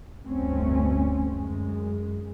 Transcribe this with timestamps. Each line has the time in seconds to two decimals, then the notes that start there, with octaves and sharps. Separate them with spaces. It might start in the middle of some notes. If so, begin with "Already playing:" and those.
0.23 F1 D2 G2 A3 C4 C#4
1.28 F#2 G#3